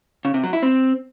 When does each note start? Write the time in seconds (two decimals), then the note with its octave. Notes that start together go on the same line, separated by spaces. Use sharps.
0.25 C#3
0.34 C3
0.44 F#3
0.53 E4
0.62 C4